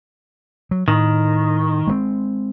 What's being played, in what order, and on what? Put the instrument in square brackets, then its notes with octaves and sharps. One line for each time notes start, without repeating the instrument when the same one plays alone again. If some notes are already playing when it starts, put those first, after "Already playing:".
[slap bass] F#3
[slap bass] A2 [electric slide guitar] D#3
[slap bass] G#3 A#3 C4